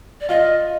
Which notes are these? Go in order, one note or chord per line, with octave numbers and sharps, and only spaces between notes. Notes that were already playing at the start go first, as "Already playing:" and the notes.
D5
F4 D#5